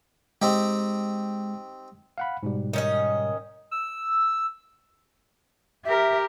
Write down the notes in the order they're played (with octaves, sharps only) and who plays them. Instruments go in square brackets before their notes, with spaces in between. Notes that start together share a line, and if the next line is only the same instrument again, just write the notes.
[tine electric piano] G#3 [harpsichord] C4 D#4 G4
[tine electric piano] F5 F#5 B5
G#2 B2 G3
[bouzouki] D#3 C#4 D#5
[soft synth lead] E6
[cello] G4 A#4 [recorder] E5